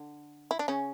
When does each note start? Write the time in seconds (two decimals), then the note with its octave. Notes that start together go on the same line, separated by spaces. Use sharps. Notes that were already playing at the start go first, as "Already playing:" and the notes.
Already playing: D3
0.51 E4
0.59 D4
0.68 C#3 C#4